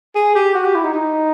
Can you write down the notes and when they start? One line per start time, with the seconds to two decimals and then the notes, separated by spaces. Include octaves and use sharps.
0.15 G#4
0.35 G4
0.55 F#4
0.64 G4
0.75 E4
0.84 D#4
0.94 D#4